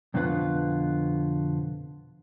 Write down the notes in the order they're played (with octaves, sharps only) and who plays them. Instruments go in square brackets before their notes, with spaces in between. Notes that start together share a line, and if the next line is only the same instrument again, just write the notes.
[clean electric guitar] F2 B2 D3 F4 B4 F#5